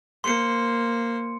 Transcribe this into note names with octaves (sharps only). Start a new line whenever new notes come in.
A#3 C5 C6 C#7